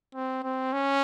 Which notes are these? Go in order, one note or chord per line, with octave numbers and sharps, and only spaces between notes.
C4
C4
C#4